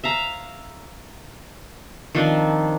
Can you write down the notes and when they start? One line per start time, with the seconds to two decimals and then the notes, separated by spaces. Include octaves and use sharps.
0.04 E5 F5 A#5
2.15 D#3 F3 C4 D4